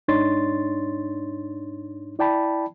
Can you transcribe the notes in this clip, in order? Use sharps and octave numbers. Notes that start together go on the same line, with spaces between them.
G#2 D4 D#4 C#5 C6 A6
E4 D5 G5 A5 B5